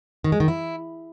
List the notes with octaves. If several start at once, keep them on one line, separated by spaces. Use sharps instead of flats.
D#3
G#3
D#3
E4